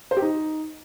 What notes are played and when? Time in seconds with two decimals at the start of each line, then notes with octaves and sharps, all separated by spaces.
0.11 C5
0.17 G4
0.22 D#4